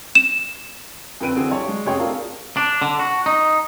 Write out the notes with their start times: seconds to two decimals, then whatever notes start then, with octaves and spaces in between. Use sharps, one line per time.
0.15 E7
1.20 F2 D3 C4 B4 D7 D#7
1.36 D3 E3 C4 F#4 G#4
1.48 G2 G3 C#5
1.68 G#3
1.86 F1 C#4 F#4 G#4 C#5 G5
1.99 A3 C4 D4 F4 G#4 A#4
2.57 D4
2.82 D3
2.99 F#4
3.26 D#4